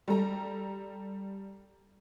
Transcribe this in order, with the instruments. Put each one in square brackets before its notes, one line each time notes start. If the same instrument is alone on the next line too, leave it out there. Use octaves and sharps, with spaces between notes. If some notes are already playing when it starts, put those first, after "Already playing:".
[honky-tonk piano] G3 A4 A#5